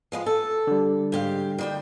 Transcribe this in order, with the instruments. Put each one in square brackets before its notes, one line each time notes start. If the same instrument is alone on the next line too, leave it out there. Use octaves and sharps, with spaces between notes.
[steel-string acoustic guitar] F3 G#3 B3
A4
[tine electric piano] D3 G3
[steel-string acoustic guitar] G#2 G4 F5
D#3 G3 G5